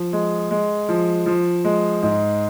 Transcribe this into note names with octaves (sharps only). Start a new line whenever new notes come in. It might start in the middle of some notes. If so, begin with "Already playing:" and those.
Already playing: F3
G#3
G#3
F3
F3
G#3
G#2